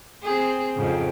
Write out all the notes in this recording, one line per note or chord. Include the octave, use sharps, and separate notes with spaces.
C4 G#4
F2 G#2 C#3